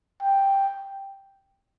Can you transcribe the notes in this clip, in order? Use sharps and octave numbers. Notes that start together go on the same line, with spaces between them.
G5